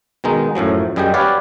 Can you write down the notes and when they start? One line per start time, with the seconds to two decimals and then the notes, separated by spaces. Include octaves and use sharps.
0.24 B2 D#3 G#3 D#4
0.55 F#2 A2 F3 F#3
0.96 F#2 G3 G#4 D#5 G5
1.14 G4 B4 C#5 D5 F5 F#5